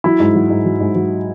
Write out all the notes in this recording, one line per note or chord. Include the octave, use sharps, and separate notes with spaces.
F#3 E4
G#2
F#3
G#2
F#3
G#2
F#3